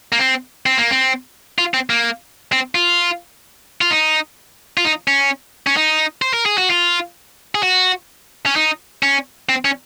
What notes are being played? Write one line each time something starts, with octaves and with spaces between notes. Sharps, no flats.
A#3
C4
C4
A#3
C4
F4
C4
A#3
C4
F4
F4
D#4
F4
D#4
C#4
C#4
D#4
C5
A#4
G#4
F#4
F4
G#4
F#4
C#4
D#4
C#4
C4
C#4